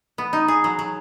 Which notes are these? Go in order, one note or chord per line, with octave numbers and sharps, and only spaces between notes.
B3
D#4
G#4
F#3
F#3